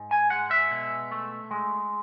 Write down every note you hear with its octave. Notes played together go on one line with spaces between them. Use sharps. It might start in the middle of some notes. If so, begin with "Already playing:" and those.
Already playing: G#2
G#5
G#3 F#5
E5
B2
A3
G#3